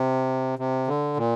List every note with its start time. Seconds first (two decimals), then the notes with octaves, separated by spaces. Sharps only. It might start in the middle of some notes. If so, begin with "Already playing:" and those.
Already playing: C3
0.59 C3
0.88 D3
1.17 A#2